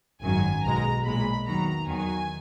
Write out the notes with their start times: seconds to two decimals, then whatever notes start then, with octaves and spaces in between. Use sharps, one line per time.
0.23 G#1 F#2 D#3 F#3 G#5
0.64 B1 B2 G#3 A#5
1.05 B1 A#2 G#3 B5
1.47 E2 D#3 F#3 A#5
1.88 E2 D#3 F#3 G#5